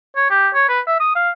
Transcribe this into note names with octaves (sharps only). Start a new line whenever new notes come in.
C#5
G4
C#5
B4
E5
D#6
F5